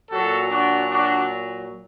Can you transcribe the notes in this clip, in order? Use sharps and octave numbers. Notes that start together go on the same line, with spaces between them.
A#2 F#3 F#4 A4
D4 F#4
D4 F#4